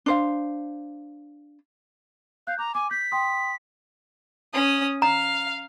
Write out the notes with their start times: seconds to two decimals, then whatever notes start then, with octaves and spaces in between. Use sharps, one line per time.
0.06 D4 C5 F5
2.47 F5 F#6 G6
2.59 A#5 D6
2.75 G#5 D6
2.91 G6 B6
3.12 G5 C6 D#6
4.54 C#4 D#6
5.02 F5 A#5